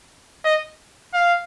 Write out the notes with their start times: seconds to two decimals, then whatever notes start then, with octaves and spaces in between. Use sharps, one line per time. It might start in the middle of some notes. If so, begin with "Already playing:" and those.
0.45 D#5
1.14 F5